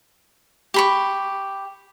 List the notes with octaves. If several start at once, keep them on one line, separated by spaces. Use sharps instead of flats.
G4 B5 C#6